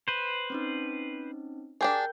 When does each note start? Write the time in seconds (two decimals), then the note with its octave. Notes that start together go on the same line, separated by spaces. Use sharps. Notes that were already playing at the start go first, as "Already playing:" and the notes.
0.08 B4 C5
0.50 C4 C#4 D#4
1.81 D4 G4 G#4 A#4 G5 G6